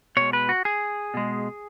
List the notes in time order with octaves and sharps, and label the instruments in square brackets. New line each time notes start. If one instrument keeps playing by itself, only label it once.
[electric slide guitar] B2 G#3 C#5
B4
F#4
G#4
B2 G#3